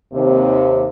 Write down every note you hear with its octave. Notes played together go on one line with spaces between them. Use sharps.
D#2 C3